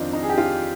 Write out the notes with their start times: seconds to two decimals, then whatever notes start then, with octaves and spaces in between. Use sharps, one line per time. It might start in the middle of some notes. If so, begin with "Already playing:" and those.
Already playing: F2 D#3 C4 D4 D#4 F4
0.13 D#4
0.22 G#4
0.29 G4
0.38 F4